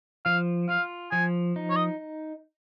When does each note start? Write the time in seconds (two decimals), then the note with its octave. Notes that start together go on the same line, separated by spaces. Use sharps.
0.25 F3 F5
0.69 F4 F5
1.11 F3 G#5
1.56 D#4
1.70 C#5
1.76 D#5